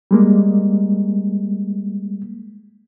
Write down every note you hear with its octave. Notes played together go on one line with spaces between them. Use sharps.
G3 G#3 A#3